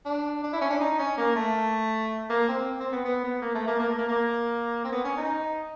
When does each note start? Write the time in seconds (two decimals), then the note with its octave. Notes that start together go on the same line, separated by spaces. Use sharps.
0.05 D4
0.43 D4
0.53 E4
0.61 C#4
0.70 D4
0.81 D#4
0.99 C#4
1.18 A#3
1.36 A3
2.30 A#3
2.49 C4
2.80 C4
2.92 B3
3.05 B3
3.24 B3
3.42 A#3
3.55 A3
3.67 A#3
3.79 A#3
3.89 A3
3.98 A#3
4.08 A#3
4.84 C4
4.92 B3
5.04 C#4
5.17 D#4